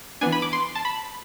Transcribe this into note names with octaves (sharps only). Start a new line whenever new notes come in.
E3 B3 D4 G#5
B5
D6
C6
A5
B5